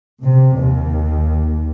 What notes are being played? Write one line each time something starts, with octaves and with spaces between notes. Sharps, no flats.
C3
D#2